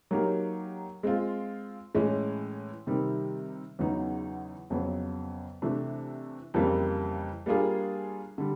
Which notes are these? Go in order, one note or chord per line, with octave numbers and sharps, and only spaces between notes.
F#3 A#3 D#4 G4 A#4
G#3 C4 F4
A2 E3 G#3 C#4
C3 D#3 G3 C4
E2 C#3 F#3 B3 D#4
F2 C#3 F#3 B3
C3 E3 A3 D4
F2 C#3 E3 G3 A#3
G3 A#3 D4 F4 G#4
D3 G3